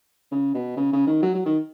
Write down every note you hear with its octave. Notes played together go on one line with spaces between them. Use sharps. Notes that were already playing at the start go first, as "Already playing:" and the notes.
C#3
B2
C#3
C#3
D#3
F#3
F#3
D#3